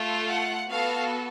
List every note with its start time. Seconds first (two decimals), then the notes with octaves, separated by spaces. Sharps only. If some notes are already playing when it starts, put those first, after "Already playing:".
Already playing: A3 F4 A4
0.29 F#5
0.69 B3 F#4 A4 F5